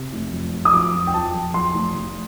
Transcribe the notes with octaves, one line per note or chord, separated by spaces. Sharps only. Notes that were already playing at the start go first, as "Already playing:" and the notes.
Already playing: C3
F1
F2
F2
D#6
F3 D6
F2
G5
F3 A5
F2
F2 C6
F1
F1